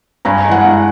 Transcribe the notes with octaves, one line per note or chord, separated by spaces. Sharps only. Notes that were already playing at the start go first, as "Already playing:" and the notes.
G2 G#5 A#5
E3 G#3
F#5 G#5
G2